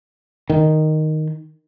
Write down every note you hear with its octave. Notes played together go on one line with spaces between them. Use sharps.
D#3